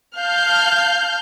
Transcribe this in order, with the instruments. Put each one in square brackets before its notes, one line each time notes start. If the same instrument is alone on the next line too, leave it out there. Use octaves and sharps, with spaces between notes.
[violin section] F5 A5 F6 G6